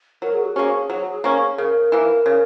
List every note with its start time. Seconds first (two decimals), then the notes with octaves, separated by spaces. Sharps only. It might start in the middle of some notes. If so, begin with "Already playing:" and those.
0.22 F#3 A#4
0.34 G#4
0.45 F#4
0.56 A#3 C#4 G#4
0.90 F#3
1.24 A#3 C#4
1.58 C#3 A#4
1.92 E3 A#3
2.26 C#3